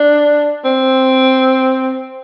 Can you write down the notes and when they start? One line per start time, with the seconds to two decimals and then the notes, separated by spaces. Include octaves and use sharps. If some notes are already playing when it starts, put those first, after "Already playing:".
Already playing: D4
0.65 C4